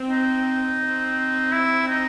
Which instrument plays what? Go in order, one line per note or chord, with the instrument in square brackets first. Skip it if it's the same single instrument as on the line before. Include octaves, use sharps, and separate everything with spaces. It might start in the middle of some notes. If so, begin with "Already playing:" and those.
Already playing: [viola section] C4
[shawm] D#4
[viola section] C4
[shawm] E4
D#4